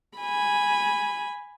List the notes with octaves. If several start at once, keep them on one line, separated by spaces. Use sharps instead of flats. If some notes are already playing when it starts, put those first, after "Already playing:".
G#5 B5